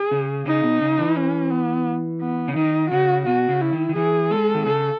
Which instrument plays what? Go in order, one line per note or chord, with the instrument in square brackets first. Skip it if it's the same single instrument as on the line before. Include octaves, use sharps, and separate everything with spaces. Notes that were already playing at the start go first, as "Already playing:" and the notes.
Already playing: [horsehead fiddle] G#4
[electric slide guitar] C#3
[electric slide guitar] C#3 [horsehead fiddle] D#4
[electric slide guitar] B2
C#3
E3
[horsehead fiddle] C#4
B3
B3
[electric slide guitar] C#3
[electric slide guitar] D#3 [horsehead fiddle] D#4
[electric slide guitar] C#3 [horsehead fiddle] F#4
[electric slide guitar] B2 [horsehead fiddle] F#4
[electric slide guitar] C#3
[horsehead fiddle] E4
[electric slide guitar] D#3
D#3
[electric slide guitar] E3 [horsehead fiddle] G#4
[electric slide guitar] G#3 [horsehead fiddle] A4
[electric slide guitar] D#3
[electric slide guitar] C#3 [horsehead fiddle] A4